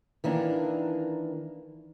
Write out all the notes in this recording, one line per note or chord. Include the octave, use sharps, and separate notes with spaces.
D#3 E3 A#3 D4